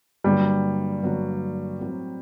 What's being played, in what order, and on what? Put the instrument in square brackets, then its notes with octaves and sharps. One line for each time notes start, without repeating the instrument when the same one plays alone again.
[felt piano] G2 D3 F#3 A#3 F#4 [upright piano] G3
[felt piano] G2 D3 F#3 A#3 F#4
A2 F#3 C4 F#4 A#4